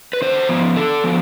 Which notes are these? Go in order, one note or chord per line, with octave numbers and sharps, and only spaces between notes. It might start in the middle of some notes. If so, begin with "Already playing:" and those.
B4
D3 C5
F3 B3
D3 A4
F3 B3